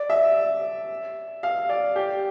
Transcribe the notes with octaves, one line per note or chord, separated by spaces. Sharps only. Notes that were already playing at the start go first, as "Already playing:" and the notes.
Already playing: D5
E5
F5
D5
G4